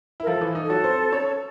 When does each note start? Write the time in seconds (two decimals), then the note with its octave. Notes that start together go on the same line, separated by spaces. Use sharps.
0.20 E4
0.23 A#4
0.27 F3 F4 A4
0.41 E3 E4
0.55 D#4
0.65 A4
0.70 F#3 F#4
0.84 C4 C5
1.12 C#4 C#5